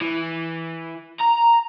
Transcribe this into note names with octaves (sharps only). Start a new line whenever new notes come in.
E3
A#5